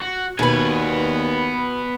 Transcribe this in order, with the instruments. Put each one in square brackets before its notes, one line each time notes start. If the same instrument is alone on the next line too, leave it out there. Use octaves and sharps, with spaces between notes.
[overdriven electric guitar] F#4
[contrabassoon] D#2 [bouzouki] B2 B4 [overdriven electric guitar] B3 G#5